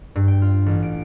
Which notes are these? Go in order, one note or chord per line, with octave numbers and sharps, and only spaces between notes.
G2
G5
F4
A1
D7